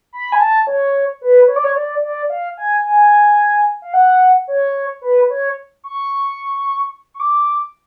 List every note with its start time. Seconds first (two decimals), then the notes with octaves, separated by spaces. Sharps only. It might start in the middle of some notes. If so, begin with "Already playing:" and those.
0.13 B5
0.32 G#5
0.40 A5
0.67 C#5
1.21 B4
1.48 C#5
1.56 D5
1.64 C#5
1.76 D5
2.03 D5
2.30 F5
2.58 G#5
2.85 G#5
3.82 F5
3.94 F#5
4.48 C#5
5.02 B4
5.30 C#5
5.84 C#6
7.14 C#6
7.20 D6